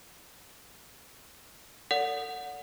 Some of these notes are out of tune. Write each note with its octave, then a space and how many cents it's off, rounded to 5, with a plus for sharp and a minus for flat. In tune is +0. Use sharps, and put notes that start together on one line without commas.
A4 +35 D5 -40 F#5 -15